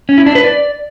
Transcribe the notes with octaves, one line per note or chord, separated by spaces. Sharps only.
C#4
E4
D4
B4
D5